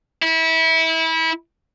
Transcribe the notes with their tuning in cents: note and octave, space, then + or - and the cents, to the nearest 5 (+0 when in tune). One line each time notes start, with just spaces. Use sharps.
E4 -25